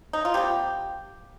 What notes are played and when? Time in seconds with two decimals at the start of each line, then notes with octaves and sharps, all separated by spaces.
0.13 D#4
0.25 F4
0.34 C3 G3 A#3 G4